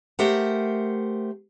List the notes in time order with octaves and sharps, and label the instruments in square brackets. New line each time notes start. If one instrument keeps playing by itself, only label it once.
[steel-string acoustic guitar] A3 G4 A#4 C5 F#5